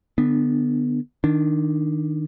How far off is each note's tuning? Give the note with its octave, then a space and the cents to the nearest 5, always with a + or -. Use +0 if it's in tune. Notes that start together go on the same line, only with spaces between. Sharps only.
D3 +0 B3 +0 D4 +30
D#3 +0 D4 +5